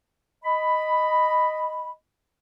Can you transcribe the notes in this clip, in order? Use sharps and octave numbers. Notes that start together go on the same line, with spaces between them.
D#5 B5